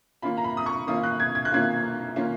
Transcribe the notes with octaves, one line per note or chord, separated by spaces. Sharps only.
D#3 A#3 C#4 F4 B5
A#5
B5
D#6
C#6
D#3 A#3 C#4 F4 D#6
F#6
G#6
G#6
F#6
D#3 A#3 C#4 F4 G#6
D#3 A#3 C#4 F4